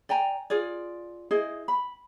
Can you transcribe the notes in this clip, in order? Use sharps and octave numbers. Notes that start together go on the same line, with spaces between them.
D5 G5 G#5 A#5
F4 G#4 D5
E4 G#4 C5 D#5
B5